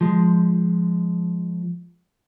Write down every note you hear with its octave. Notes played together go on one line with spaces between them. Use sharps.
F3 G#3